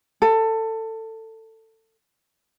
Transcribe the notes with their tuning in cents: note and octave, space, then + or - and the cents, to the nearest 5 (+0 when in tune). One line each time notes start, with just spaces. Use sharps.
A4 +20